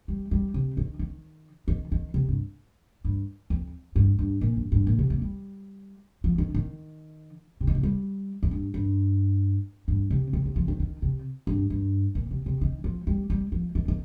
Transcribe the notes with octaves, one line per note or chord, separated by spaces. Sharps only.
G3
G3
C3
D#3
D#3
D#3
D#3
C3
G2
G2
F2
G2
G2
A#2
G2
G2
A#2
C3
A#3
G3
F3
D#3
D#3
C3
D#3
C3
G3
F2
G2
G2
G2
C3
C3
C3
F3
D#3
D#3
C3
G2
G2
A#2
C3
C3
D#3
F3
G3
G3
F3
D#3
D#3